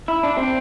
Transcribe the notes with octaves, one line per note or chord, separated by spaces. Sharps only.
E4
D4
C4